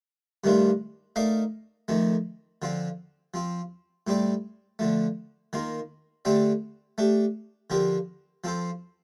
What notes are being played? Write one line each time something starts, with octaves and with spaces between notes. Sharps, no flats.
G2 D#3 A3 D4 F4
A3 D#4 A#4 D5 F5
F2 D#3 A3
D3 F3 C4 F4
F3 C4 F4
A2 G3 C4 G4 D5
D3 F3 A3
D#3 A#3 F4
D3 A3 C4 G4 D5
A3 D4 G4
D3 F3 C4 G4 A#4
F3 C4 F4 A4 C5